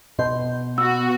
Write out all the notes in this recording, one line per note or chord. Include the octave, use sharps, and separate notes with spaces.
B2 D#5 C6 G6
B3 F#4 E6